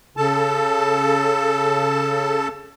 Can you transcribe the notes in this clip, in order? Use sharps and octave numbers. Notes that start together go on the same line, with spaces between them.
C#3 A4 A5